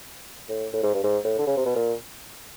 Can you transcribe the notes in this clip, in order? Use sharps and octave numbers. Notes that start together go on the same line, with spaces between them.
A2
A2
G#2
G2
G#2
A2
D3
C#3
C3
B2
A#2